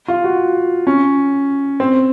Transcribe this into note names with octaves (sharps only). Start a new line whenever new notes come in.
F4
F#4
C#4
C4